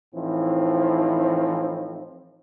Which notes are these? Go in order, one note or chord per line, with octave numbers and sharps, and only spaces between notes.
A2 E3 F3 C4 D#4